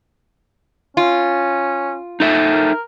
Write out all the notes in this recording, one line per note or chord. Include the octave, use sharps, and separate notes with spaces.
C#4 F4
D#4 A4 E5
A#4